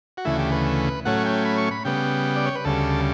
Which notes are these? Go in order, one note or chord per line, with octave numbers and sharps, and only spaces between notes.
F#4
D2 C#3 E3 A3 E4
G4
B4
A2 F#3 A3 C#4 F#5
G5
B5
C#6
B5
C#3 G3 B3 G5
D5
C#5
B4
D2 C#3 G3 A4